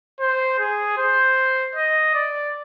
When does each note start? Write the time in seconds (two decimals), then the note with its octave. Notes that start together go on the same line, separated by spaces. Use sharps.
0.20 C5
0.59 G#4
0.98 C5
1.75 D#5
2.14 D5